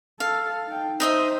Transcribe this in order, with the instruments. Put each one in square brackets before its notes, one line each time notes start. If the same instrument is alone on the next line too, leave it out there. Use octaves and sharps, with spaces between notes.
[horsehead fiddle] A4 [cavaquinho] F5
[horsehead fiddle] D#4 G5
[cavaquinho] D#4 D#5 E5 [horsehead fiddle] C5